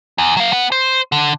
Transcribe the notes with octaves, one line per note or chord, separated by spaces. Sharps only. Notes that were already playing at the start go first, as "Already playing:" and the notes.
E2
F#3 F5
B3 F#5
C5
D3